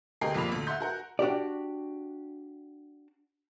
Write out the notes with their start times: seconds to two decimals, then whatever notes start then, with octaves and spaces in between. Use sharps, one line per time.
0.21 D2 G4 A#4 D#5 C7
0.34 A#1 F2 A#2 A#3 B5 F7
0.52 D2
0.67 E5 F#5 C6 G6
0.80 F#4 A#4 F#5
1.19 D4 F#4 G4 D5